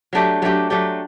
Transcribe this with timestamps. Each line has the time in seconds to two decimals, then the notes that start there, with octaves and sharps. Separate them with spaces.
0.13 F#3 A3 D4 G4
0.42 F#3 A3 D4 G4
0.70 F#3 A3 D4 G4